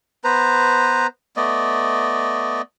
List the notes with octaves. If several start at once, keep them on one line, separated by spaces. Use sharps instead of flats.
B3 B4 C5 A#5
A3 B3 D5 D#5